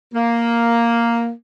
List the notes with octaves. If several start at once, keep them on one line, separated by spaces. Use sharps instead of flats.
A#3